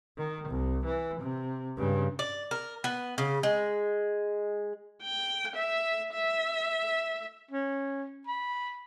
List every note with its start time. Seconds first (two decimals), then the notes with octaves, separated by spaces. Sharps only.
0.18 D#3
0.49 C2
0.85 E3
1.20 C3
1.77 G2 C#3
2.19 D5
2.51 A#4
2.84 B3
3.18 C#3
3.43 G#3
5.02 G5
5.56 E5
6.13 E5
7.51 C#4
8.27 B5